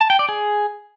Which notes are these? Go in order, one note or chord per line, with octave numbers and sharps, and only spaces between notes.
A5
G5
D5
G#4